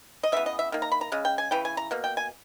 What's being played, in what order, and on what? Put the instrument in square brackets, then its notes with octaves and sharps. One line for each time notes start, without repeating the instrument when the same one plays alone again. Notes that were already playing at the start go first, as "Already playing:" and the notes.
[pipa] D#5
C#3 E3 B3 E5
D#5
E5
D#3 A#3
A#5
B5
A#5
C#3 G#3
G5
G#5
C#3 E3 G5
G#5
A#5
B2 A#3
G5
G#5